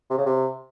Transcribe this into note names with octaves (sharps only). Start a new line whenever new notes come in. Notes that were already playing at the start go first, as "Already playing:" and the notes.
C3
C#3
C3